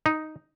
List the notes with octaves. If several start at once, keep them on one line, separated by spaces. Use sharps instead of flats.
D#4